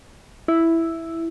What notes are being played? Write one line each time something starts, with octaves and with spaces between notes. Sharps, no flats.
E4